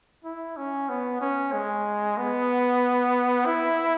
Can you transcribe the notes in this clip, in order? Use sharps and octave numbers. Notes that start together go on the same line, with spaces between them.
E4
C#4
B3
C#4
G#3
B3
E4